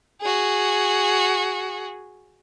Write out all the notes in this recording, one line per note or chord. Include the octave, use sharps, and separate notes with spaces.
F#4 G#4